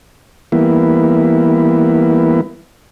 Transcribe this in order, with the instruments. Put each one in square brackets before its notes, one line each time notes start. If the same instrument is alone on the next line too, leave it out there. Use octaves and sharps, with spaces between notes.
[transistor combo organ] E3 G3 A#3 B3 E4